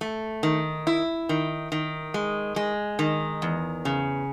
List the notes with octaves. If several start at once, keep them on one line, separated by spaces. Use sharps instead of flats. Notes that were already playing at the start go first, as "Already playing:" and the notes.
A3
D#3
E4
D#3
D#3
G#3
G#3
D#3
E2
C#3